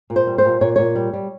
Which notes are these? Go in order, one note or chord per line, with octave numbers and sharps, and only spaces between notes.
A#2
C5
G3
C5
A#2
A#2 C#5
A#2 C#5
G3
G3